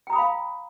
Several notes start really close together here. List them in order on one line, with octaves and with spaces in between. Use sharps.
G5 A#5 D#6 B5 F5